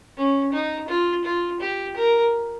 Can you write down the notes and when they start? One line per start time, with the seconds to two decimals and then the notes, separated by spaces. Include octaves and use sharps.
0.17 C#4
0.53 D#4
0.88 F4
1.24 F4
1.61 G4
1.96 A#4